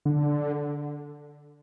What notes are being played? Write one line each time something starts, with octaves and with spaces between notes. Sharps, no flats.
D3